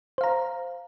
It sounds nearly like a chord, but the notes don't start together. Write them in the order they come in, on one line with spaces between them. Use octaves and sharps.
C5 F5 A#5